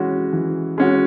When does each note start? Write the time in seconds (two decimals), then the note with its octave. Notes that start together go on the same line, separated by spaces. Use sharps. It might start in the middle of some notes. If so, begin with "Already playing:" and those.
Already playing: E3 G#3 C#4 F#4
0.33 E3
0.78 G#3 C#4 F#4